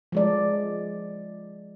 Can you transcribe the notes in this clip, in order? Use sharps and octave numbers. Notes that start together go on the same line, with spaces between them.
F3 G#3 D5